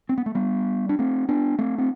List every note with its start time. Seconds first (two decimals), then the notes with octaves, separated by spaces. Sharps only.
0.09 C4
0.18 B3
0.26 A3
0.35 G3 B3
0.89 D4
0.99 A3 C4
1.29 B3 D4
1.59 A3 C4
1.78 C4